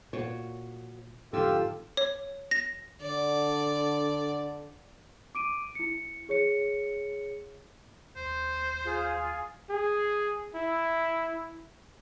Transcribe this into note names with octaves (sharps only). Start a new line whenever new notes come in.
A#2 F#4 C#5
F2 G#2 D3 F4 G4 A4 E6
C#5
A#6
D3 D5
D6 D7 D#7
E4 C#7
G#4 C#5 C#7
D#2 C5
F4 G#4
G#4
E4